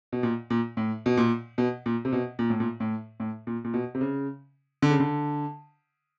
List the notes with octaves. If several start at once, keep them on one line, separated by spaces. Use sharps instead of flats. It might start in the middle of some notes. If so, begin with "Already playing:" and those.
B2
A#2
A#2
A2
B2
A#2
B2
A#2
C3
B2
A#2
A2
A#2
A2
A2
A#2
A#2
B2
C3
C#3
D3
C#3
D3